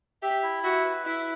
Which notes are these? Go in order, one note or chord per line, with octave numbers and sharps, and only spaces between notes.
G4 E5
E4
F#4 E5
B4
E4 E5